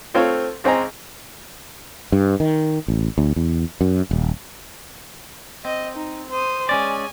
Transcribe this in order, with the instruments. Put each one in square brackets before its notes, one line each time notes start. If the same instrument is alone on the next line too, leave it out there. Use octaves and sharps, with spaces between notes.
[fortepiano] A3 C4 F4 A4 C5 C#5
C#2 C4 D#5 G#5 A#5
[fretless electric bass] G2
D#3
A1
D2
E2
F#2
D#1
[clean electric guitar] C4 [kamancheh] D#5
[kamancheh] D#4
C5 D#6
[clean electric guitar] G#3 C#4 D5 [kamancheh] G#5